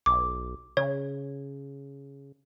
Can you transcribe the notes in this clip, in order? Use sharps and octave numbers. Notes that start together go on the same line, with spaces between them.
B1 D6
C#3 C#5